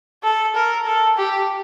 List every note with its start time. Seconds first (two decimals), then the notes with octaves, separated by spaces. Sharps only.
0.24 A4
0.55 A#4
0.86 A4
1.18 G4